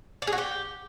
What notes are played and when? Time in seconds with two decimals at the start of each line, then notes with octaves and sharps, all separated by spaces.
0.22 D4
0.27 G#4
0.33 F#4
0.38 G4